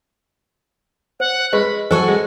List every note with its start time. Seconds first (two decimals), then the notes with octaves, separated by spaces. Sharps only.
1.20 C5 F#5
1.53 G#3 B4 D#5 B5 C#6
1.91 F#3 F#4 A4 C5 F#5 G#5 C#6
2.08 G#3